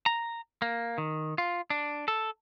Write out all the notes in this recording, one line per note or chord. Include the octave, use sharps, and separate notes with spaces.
A#5
A#3
D#3
F4
D4
A4